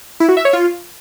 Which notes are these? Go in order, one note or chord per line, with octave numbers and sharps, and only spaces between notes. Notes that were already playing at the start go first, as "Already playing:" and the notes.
E4
F#4
E5
C#5
F4